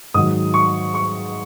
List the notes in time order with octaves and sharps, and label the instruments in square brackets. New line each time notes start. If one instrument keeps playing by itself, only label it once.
[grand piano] G#2 D#3 F#3 D#6
C#6
C#6